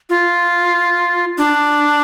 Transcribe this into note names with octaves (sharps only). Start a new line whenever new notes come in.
F4
D4